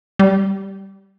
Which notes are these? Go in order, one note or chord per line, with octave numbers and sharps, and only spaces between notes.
G3